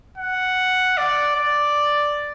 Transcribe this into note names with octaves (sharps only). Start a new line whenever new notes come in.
F#5
D5
D5